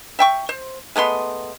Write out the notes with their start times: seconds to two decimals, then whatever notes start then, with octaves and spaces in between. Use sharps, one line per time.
0.19 E5 G5 C#6
0.49 C5
0.96 G#3 A3 B3 C6